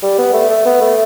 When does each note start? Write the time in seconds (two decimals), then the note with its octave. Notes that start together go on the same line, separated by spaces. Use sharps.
0.03 G3
0.18 B3
0.34 A3
0.50 A3
0.66 B3
0.81 A3